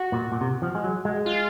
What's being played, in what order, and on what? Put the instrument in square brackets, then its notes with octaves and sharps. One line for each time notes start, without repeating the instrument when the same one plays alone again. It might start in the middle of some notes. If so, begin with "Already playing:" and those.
Already playing: [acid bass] F#4
[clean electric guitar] A#2
A#2
C3
F3
G#3
F#3
G#3
[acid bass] F4